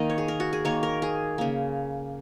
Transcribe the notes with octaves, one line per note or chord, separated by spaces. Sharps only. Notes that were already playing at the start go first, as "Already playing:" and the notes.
Already playing: D#3 A#3 D#5
C#5
G#4
A#4
F#4
G#4
D#3 A#3 C#5
A#4
G#4
C#3 A#3